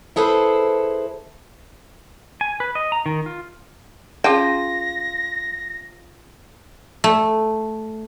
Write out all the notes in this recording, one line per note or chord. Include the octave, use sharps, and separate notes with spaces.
E4 G#4 A4 B4 C5
G#5
B4
D#5
A#5
D#3
F4
C#4 F4 G#4 G5 A5 A#6
A3